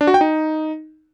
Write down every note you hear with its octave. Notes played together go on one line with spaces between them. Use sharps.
D4
F#4
G5
D#4